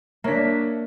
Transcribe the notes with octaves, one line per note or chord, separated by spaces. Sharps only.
A#3 D4 C#5 E5 B6